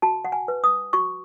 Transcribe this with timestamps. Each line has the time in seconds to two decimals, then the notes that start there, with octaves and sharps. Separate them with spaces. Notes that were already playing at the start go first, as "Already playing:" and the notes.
0.02 F#4 A5
0.25 F#5
0.32 G#5
0.48 B4
0.64 D#6
0.93 F#4 C#6